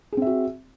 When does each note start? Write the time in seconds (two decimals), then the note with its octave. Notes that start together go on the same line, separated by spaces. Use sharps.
0.12 G#4
0.17 C4
0.22 E5
0.27 F#4